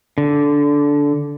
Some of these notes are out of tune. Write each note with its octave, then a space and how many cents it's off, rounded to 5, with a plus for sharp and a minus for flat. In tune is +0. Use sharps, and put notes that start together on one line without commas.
D3 -15